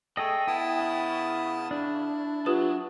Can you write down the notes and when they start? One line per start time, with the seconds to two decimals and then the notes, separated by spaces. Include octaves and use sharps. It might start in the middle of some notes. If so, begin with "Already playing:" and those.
0.17 A3 G#4 A4 D#5 G5
0.47 B3 E4 A5 D#6
0.80 C#3
1.71 D4 E4
2.46 F#3 F4 G4 B4